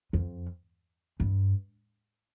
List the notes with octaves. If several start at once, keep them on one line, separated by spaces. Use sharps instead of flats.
F2
G2